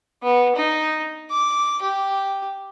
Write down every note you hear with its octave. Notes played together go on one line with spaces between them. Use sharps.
B3
D#4
D6
G4